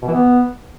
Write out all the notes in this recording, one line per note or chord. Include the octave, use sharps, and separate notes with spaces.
B2
E3
B3